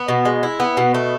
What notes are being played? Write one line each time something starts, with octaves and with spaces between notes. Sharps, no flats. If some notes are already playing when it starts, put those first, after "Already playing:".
Already playing: B3
B2
G#3
E4
B3
B2
A3